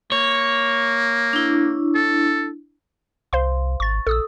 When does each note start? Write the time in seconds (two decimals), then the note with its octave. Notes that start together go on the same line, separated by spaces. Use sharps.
0.12 A#3 C#5
1.33 D4 E4
1.95 A4
3.33 C2 C5 F5 C6
3.80 G#1 C#6 A6
4.07 A#1 A4 D#6 E6